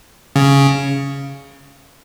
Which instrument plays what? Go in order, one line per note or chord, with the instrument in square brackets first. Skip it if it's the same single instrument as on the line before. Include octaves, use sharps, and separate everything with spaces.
[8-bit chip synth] C#3